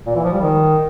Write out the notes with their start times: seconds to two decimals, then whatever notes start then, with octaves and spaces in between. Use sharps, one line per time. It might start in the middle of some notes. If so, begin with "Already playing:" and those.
0.07 A#2
0.15 E3
0.24 F3
0.32 G3
0.41 D#3